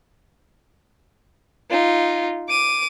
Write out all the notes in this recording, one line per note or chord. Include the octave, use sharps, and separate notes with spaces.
D#4 F4
D6 D#7